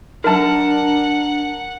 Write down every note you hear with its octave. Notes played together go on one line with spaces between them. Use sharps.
F#3 D4 D#4 A#4 F#5 A5